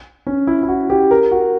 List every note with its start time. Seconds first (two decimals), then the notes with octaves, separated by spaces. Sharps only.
0.27 C#4
0.47 E4
0.63 E4
0.68 F#4
0.90 G4
1.11 A#4
1.31 F#4